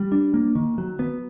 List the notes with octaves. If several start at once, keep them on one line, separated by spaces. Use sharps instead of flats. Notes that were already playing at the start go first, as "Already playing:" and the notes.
Already playing: G3
D4
A#3
D#3
F#3
B3